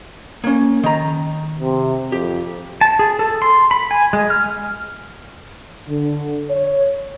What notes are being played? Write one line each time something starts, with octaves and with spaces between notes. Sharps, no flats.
A#3 C#4
D#3 A#5
C3
F2 G4
A5
G#4
A4
C6
B5
G#5
G#3
F6
D3
C#5